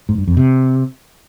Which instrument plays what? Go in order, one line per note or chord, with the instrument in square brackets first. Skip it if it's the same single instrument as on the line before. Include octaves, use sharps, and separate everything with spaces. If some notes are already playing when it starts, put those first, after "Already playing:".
[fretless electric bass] G#2
G2
F2
C3